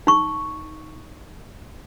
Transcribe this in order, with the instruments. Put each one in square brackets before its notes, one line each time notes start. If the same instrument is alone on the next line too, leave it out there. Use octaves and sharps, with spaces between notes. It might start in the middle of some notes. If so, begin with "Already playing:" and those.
[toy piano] D#4 C#6